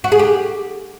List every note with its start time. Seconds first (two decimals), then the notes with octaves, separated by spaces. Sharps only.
0.04 F#4
0.12 G#4
0.19 G4